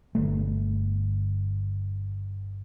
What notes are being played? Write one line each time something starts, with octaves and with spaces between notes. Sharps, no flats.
G1 A3